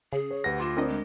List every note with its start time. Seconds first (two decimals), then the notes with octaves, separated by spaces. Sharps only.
0.13 C#3 G#4
0.31 C#5
0.44 D2 G4 B4 F#5 A#6
0.60 F4 C6 D6 E7
0.77 C4 D4 A#4 D#5
0.88 G#3